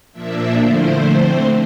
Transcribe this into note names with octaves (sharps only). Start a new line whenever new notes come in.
A#2 F3 A#3 D4 E5
D3 F3 A3 E4 C5
D3 A3 C4